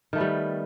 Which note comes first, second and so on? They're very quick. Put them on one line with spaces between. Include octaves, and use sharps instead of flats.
D#3 A3 B3 G3